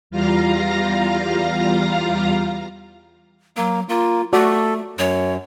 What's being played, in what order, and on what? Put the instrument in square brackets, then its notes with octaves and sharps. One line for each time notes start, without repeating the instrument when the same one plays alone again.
[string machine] E2 G3 F4 F5 A#5 A#6
[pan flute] F#3 [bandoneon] A#3
[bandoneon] A#3 [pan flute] F4
[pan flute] A3 [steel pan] F#4 D5 [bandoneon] A4
[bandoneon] F#2 [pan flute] C#5